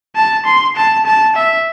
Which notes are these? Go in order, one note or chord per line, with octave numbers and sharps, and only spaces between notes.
A5
C6
A5
A5
E5